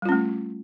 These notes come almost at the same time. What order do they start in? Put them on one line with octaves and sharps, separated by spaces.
G3 F4 C#4 A3